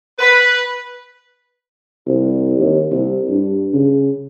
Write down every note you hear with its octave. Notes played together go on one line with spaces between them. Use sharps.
B4
C2
D#2
C2
G2
C#3